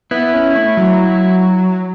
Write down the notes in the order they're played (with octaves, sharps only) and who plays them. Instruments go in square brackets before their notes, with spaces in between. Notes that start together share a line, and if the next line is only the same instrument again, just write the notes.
[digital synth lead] B3 [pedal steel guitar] E4
[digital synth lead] C#4
A3
F#3